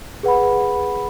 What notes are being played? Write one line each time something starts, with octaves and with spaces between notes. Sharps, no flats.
G#4 B4 F#5 B5